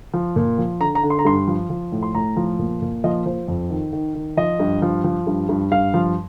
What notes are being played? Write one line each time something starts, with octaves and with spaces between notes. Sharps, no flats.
F3
A#2
F3
D3 A#5
A#5
D3
C6
A#5
G2 C6
F3
F3
A2
C6
A2 A#5
F3
A#2
A#2
F3 D#5
F3 C5
F2
D#3
D#3
D#3
F3 D#5
G2
F3
F3
G2
G2
G2 F5
F3